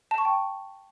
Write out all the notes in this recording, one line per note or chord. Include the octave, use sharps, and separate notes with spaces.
A5
C#6
G5